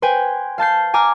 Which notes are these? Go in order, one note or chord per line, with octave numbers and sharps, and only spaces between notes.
B4 C5 G5 G#5
F5 A5 G6 C7
G#5 A#5 D6 F6